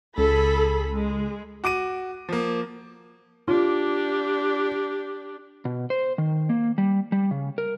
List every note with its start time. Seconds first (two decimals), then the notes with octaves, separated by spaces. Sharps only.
0.18 C#2 G#4 A4 B5
0.92 G#3
1.64 F#4 D6 D7 D#7
2.29 F3 A#3
3.48 D4 F4 G4
5.65 B2
5.90 C5
6.18 D#3
6.49 A#3
6.78 G3
7.12 G3
7.31 C#3
7.58 A#4